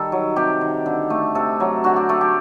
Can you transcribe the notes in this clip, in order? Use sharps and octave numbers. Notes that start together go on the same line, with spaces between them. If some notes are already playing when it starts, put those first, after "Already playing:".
Already playing: D#3 G3 A4
F#3
C3 G4
D#3
D3
A3
C3 A4
F#3
D3 F#4
G4
A3 A4
G4